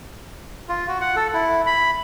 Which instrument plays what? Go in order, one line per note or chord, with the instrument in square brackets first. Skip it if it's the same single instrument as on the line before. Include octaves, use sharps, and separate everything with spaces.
[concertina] F4
F#4
F#5
A4
E4
B5